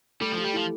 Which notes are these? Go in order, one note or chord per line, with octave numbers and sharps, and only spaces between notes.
G3 A3
F3 G4
G3
F3 E4